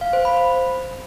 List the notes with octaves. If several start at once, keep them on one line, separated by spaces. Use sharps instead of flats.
F5
C5
B5
B5